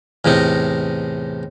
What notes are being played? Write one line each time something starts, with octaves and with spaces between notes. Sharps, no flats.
E2 A2 C3 D#4